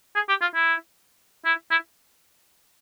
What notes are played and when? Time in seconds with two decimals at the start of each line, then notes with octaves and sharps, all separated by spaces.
0.15 G#4
0.29 G4
0.41 F4
0.54 E4
1.45 E4
1.71 E4